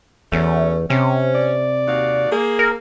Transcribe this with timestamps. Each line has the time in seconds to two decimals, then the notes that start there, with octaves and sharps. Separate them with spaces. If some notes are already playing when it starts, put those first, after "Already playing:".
0.32 E2 F#3 A3 C#4
0.90 C3 C#4
1.35 D5
1.87 D#2 F#4 F5
2.32 A#3 G#4
2.59 A#4